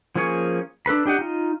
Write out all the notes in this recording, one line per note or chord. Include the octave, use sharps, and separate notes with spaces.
F3 A#3 C#4 G#4 C#5
D4 A4 B4 B5
D4 G4 D#5 F#5
D#4 F4